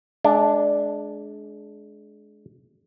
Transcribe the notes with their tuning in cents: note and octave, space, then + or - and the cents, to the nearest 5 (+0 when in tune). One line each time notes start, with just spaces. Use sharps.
G#3 +30 D4 +0